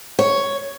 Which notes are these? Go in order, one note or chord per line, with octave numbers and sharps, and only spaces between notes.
C#5